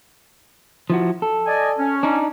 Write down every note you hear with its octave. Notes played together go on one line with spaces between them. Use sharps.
F3 E4 F#4
A4
D5 D#5 G#5
C#4
D4 D#4